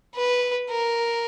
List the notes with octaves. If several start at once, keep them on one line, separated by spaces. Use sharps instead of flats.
B4
A#4